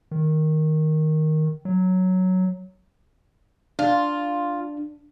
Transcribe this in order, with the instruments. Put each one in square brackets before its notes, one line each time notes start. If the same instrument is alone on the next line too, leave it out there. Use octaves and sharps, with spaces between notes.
[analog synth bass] D#3
F#3
[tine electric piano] D4 [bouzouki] F4